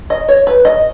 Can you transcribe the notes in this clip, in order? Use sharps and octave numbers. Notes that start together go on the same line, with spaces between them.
D#5
C#5
B4
D#5